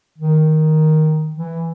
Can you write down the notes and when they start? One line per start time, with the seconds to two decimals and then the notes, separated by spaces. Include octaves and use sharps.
0.18 D#3
1.36 E3